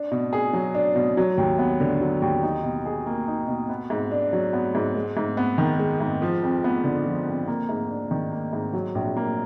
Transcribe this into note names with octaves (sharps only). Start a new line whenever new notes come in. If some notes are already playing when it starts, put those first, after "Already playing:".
Already playing: D4
B2
G#4
F#3
D4
B2
F#3
D#2
B3
D3
F#3
D#2
D#4
B2
G#4
A#3
D#4
B2
B3
G#2
D4
F#3
B3
G#2
G#3
G#2
B3
D#3
G#3
G#2
F3
F2
B3
D3
F3
F2
A#3
G#2
D4
D#3
A#3
G#2
F#3
A#1
A#3